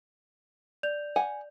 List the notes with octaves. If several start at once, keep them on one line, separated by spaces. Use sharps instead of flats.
D5 G6 F7
F#5 G#5